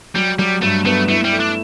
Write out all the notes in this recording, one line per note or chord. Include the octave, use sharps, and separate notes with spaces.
F#3 G3
F#3 G3
G2 A3
A3 B3
A3 E4
G3
A3
D4